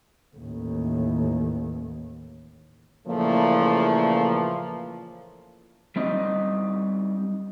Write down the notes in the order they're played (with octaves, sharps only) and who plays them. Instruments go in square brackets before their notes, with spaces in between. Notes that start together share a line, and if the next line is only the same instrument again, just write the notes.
[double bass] A1 D#2
[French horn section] A#2 C#3 E3 F3 A3 A#3
[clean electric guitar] G3 C4 D#4 D#5